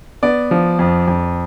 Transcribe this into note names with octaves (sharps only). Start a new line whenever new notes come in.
B3 D5
F3
F2
F2